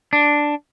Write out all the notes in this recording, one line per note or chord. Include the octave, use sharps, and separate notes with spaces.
D4